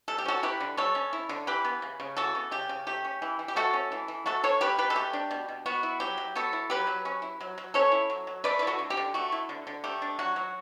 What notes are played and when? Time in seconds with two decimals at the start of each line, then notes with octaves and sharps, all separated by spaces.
0.08 G3 A4
0.18 G4
0.25 C#4 F#4 A4
0.43 E4 G4 B4
0.60 D3
0.77 G3 A4 C#5
0.95 C#4
1.13 E4
1.29 D3
1.47 E3 G4 B4
1.65 B3
1.82 C#3
2.00 C#3
2.17 E3 F#4 A4
2.35 B3
2.51 C#3 G4
2.69 C#3
2.87 A3 G4
3.04 C#4
3.22 E3
3.39 E3
3.48 G4
3.56 A3 F#4 A4
3.73 C#4
3.92 E3
4.08 E3
4.26 A3 F#4 A4
4.44 D4 A4 C#5
4.61 B2 G4 B4
4.78 B2 G4 B4
4.90 A4
4.96 A3 G4
5.13 D4
5.31 B2
5.49 B2
5.66 B3 F#4
5.83 E4
6.00 F#3 G4
6.18 F#3
6.35 B3 F#4 A4
6.53 E4
6.70 F#3 G4 B4
6.87 F#3
7.05 C#4
7.22 E4
7.41 F#3
7.58 F#3
7.74 C#4 A4 C#5
7.92 E4
8.10 F#3
8.27 F#3
8.44 A3 B4 D5
8.59 B4
8.62 E4
8.67 F#4 A4
8.79 D3
8.90 G4
8.97 D3
9.14 A3 F#4
9.32 E4
9.49 D3
9.67 D3
9.84 A3 G4
10.02 D4
10.19 F#3 F#4
10.36 F#3